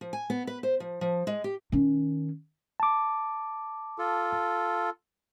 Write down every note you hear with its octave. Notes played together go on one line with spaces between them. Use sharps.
F3
G#5
B3
B4
C5
F3
F3
G#3
G4
D#3 C#4
A5 D6
F4 A4